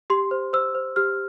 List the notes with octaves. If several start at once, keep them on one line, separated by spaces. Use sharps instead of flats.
G4 C6
C5
C5 E6
C5
G4 F6